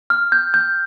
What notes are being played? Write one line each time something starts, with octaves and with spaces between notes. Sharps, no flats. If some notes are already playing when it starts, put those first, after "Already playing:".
F6
G6
G6